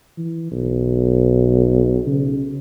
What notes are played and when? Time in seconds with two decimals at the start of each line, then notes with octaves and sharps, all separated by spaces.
0.18 E3
0.52 B1
2.07 C#3